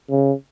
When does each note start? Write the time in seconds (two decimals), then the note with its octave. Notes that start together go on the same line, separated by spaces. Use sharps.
0.10 C#3